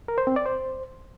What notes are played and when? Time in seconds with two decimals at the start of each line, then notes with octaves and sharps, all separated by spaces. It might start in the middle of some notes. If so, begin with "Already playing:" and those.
0.08 A#4
0.18 C5
0.27 C4
0.36 D5
0.46 C5